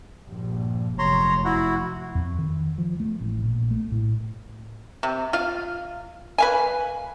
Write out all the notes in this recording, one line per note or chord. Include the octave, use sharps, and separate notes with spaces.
A#1 G2
F1 F#2 C#5 A#5 C6
E4 F#4
F2
D#3
F3
A3
A1
A#1
A3
A2
C3
F4 F5
B4 F5 G#5